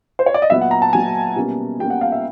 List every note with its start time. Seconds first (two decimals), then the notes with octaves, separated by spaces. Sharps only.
0.19 C5
0.26 C#5
0.34 D5
0.42 D#5
0.50 A#2 F#3 B3 E5
0.61 F#5
0.71 A#5
0.82 A5
0.93 A#2 F#3 B3 G#5
1.36 B2 G3 A#3 C#4
1.80 B2 G3 A#3 C#4 G5
1.90 F#5
2.01 F5
2.12 E5